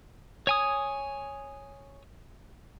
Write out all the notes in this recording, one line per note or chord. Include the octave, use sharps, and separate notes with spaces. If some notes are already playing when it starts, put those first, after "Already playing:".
C#5 G#5 D#6